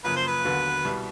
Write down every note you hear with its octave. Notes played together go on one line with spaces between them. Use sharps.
F#2 C#3 F3 A#3 B4
C5
B4
D#2 D3 F#3 B3
C2 B2 G3